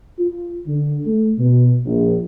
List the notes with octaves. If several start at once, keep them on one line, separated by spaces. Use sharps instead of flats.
F4
D3
A3
B2
A#1